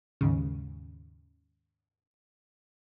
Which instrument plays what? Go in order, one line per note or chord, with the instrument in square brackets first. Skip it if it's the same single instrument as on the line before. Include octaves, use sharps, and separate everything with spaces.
[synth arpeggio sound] D#2 G#2 C#3